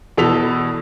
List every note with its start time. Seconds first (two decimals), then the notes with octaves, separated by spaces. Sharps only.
0.17 E2 B2 A4 E6 B6 F7